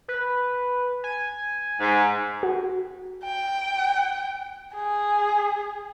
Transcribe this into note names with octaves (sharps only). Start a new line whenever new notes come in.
B4
G#5
G#2
F#4
G5
G#4